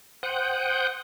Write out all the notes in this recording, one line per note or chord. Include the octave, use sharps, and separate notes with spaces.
C5 F#5 G5 D#6 F#6 G6